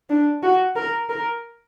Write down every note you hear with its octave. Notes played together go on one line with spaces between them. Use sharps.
D4
F#4
A#4
A#4